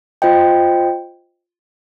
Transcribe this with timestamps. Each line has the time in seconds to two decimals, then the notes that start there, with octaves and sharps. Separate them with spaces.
0.22 F4 C5 D#5 G5